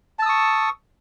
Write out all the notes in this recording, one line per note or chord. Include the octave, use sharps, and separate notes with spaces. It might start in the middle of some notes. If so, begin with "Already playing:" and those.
A5 C#6 D#6 E6